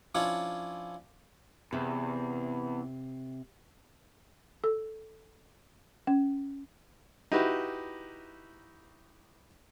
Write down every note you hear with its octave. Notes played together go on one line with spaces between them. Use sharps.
F3 C#4 D4 E4 C#5
E2 C3
A4
C#4
D#4 E4 F#4 G4 B4